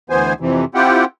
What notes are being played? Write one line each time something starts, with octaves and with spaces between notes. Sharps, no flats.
D2 E3 B3 C5 G#5
F2 C3 E3
C4 E4 F4 G4 F#5 G5